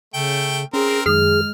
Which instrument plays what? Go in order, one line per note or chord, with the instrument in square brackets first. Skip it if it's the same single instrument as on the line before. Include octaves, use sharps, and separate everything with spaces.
[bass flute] C#3 [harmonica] A3 G5
[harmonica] C4 A#4 [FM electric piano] C#4 [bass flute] G#4
[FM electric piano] F#2 D#3 [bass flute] G#3 [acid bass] G#4 [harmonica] F6